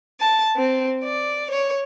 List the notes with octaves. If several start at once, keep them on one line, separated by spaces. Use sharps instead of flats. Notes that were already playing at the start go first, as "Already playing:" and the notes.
A5
C4
D5
C#5